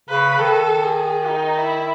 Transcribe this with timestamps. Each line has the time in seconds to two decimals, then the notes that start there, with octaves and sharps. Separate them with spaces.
0.09 C#3 B4
0.39 D#3 A4
0.84 G#4
1.28 D#4
1.58 E4